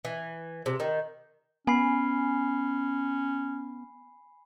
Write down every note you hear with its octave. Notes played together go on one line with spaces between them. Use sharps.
E3
C3
D#3
B3 C#4 G#5 B5 C7